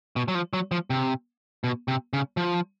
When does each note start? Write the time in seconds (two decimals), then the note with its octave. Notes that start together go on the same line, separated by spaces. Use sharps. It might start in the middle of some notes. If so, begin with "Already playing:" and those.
0.16 B2
0.28 F#3
0.35 F3
0.53 F#3
0.72 F3
0.90 C3
1.64 B2
1.88 C3
2.13 C#3
2.37 F3